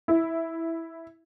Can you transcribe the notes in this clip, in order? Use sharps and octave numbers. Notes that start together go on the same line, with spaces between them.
E4